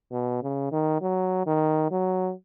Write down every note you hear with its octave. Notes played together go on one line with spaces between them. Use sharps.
B2
C#3
D#3
F#3
D#3
F#3